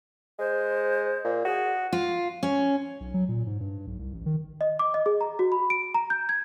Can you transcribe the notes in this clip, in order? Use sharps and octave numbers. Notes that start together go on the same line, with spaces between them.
G#3 C5
A#2
F#4 G#4
F4
C#4
B1
F#3
A#2
G#2
G2
B1
C2
A1
D#3
D#5
D6
D#5
G#4
A#5
F#4
B5
D7
A#5
G6
G#6